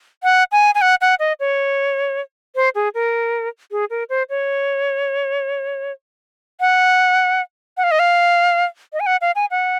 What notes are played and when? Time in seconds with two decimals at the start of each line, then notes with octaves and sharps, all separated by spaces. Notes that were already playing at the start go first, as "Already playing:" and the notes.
0.23 F#5
0.52 G#5
0.75 G#5
0.81 F#5
1.01 F#5
1.19 D#5
1.40 C#5
2.56 C5
2.75 G#4
2.94 A#4
3.71 G#4
3.90 A#4
4.10 C5
4.30 C#5
6.60 F#5
7.77 F#5
7.84 F5
7.91 D#5
7.99 F5
8.93 D#5
9.00 G#5
9.06 F#5
9.21 F5
9.35 G#5
9.51 F#5